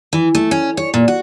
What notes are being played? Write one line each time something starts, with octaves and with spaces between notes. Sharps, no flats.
E3
A3
C#4
C#5
A#2
F#4